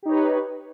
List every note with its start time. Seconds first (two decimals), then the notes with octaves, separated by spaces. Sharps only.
0.03 G4
0.05 D#4
0.08 C#5
0.11 B4